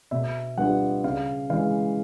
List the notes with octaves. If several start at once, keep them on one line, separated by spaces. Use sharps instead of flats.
B2 E5
G3 B3 D4 F4 F#5
C#3 F5
E3 G#3 F5